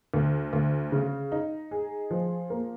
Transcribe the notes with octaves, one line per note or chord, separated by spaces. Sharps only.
D2
D2
C#3
D#4
G#4
F3
A#3